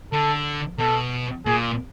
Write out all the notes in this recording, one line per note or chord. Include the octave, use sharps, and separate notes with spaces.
D3 A4
B2 A4
A#2 G#4